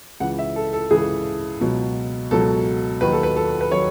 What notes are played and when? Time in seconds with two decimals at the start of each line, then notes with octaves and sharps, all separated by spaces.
0.20 C#2 C#3 E3 F#5
0.39 E5
0.56 A4
0.73 A4
0.91 C#2 C#3 E3 G#4
1.61 C#2 B2 F#3
2.31 C#2 B2 F#3 A4
3.01 D#2 D#3 F#3 B4
3.12 A4
3.23 B4
3.36 A4
3.61 B4
3.71 D#3 F#3 C#5